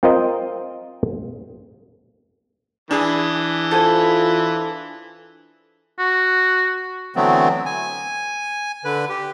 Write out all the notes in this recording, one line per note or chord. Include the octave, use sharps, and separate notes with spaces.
C4 F4 A#4 C5 D#5
E3 D4 G#4
F4 A4 C5 G#5
F#4
D3 E3 F#3 A3 B3 C4
G#5
D3 B4
G4